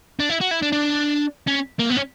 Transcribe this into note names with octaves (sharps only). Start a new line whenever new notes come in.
D4
E4
F#4
E4
D4
D4
C#4
A#3
B3
C#4